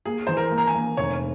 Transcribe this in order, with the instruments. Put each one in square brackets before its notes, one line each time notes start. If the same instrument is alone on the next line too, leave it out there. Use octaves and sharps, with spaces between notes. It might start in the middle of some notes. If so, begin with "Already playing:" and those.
[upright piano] A#3 [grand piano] G#4
[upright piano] E3 [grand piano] C5
[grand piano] A#4
[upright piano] A#3
[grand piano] A#5
G#5
[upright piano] A#3
[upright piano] F1 [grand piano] C#5